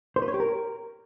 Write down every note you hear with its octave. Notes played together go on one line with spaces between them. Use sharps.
C5
B4
C#5
G4
A#4